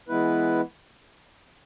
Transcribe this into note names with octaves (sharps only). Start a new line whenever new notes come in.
E3 G#3 B3 E4 B4